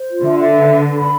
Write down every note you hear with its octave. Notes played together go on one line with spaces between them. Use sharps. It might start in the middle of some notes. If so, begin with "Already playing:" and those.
Already playing: C5
F4
D3 E5
E5
B4
B4
B4
B5